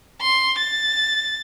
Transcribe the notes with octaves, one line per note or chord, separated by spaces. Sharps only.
C6
A6